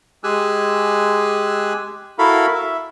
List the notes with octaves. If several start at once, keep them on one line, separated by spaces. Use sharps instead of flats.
G#3 G4 G#4 G#5 E6 F#6
E4 F#4 A4 A#4 F5 B5
E5